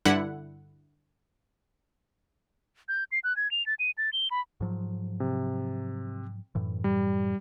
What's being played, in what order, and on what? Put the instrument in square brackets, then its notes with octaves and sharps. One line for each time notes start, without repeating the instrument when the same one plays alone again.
[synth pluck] G2 D3 E4 F#5
[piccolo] G6
C7
F#6
G#6
F7
A6
D#7
A6
G7
B5
[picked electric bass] G#2 F3 F#3
[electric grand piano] C3
[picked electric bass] F#2 A2 E3
[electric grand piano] G3